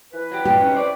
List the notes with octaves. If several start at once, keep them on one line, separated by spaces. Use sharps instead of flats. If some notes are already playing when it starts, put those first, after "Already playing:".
E3 B4
F#3 G4
A#2 D#4 G4
C#4 D#4
C5 D5